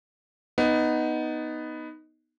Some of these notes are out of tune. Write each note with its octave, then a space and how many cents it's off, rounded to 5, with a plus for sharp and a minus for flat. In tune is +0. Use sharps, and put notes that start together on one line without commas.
B3 +0 D#4 +0